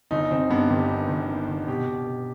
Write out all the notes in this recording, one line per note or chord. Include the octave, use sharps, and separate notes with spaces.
G1 D#4
G1 C4
G2 B3
G1 G4
D#3
G1
D#3
G1
B2 G4
B2
B2